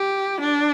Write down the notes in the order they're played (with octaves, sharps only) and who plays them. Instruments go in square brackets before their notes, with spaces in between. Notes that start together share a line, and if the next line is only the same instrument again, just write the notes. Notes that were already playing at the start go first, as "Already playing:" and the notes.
Already playing: [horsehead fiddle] G4
D4